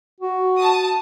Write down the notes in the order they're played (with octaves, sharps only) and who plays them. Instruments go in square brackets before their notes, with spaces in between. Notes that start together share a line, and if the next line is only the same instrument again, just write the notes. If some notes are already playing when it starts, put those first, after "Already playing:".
[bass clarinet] F#4
[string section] A5 D#6